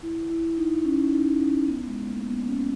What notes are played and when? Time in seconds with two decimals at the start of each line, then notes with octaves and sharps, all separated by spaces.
0.03 E4
0.30 E4
0.57 D#4
0.85 C#4
1.12 D#4
1.39 C#4
1.66 B3
1.87 G#3
2.07 A#3
2.27 B3
2.48 C#4